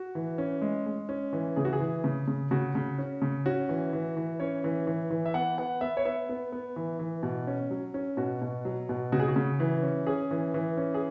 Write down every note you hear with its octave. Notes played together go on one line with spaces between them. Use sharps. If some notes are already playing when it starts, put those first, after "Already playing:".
Already playing: F#4
E3
C#4
G#3
G#3
C#4
E3
C#3 G#4
F#4
G#4
E3
C#3
C#3
C#3 F#4
C#3
C#4
C#3
C#4 F#4
E3
E3
E3
C#4 C#5
E3
E3
E3
E5
B3 F#5
B3 F#5
B3 E5
C#5
B3 E5
B3
B3
E3
E3
B2
C#4
F#3
C#4
B2 F#4
B2
F#3
B2
C#3 F#4
G#4
F#4
C#3
E3
C#4
C#4 G#4
E3
E3
C#4
G#4